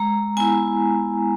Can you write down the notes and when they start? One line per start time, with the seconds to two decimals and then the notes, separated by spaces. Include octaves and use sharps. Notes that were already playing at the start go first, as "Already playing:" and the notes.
Already playing: G#3 A#5
0.37 B3 E4 G#5